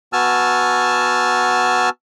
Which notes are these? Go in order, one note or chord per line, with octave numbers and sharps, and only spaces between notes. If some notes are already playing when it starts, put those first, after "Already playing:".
B3 F#4 G#5 A5 E6 F6